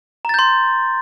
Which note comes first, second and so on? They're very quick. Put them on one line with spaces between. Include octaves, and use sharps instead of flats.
A#5 A6 G6 C6